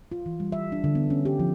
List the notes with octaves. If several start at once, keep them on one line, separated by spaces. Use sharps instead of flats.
F4
E3
G3
E5
D4
D3
B3
C#4
G4
F3